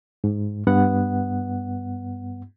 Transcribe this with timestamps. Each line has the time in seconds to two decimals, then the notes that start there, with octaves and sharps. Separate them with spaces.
0.24 G#2
0.67 G2 B3 F#5